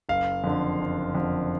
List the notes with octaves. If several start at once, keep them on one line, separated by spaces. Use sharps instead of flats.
F#1 F5
F2 D3
F#1
F2 D3